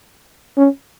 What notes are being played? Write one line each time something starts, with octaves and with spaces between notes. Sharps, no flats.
C#4